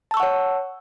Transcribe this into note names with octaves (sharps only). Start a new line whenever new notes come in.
C#5 F#5 A5 C#6 E6